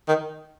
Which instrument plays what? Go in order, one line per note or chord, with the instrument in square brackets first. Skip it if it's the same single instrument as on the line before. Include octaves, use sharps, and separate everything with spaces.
[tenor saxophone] D#3